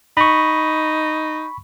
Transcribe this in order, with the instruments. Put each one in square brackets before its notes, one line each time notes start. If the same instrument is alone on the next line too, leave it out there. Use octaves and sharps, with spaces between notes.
[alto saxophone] D#4 [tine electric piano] B5 C#6